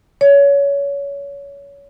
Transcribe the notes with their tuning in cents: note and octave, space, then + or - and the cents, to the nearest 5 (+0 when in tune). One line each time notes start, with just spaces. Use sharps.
C#5 +25